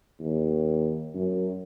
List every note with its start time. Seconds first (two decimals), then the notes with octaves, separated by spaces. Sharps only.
0.20 D#2
1.14 F#2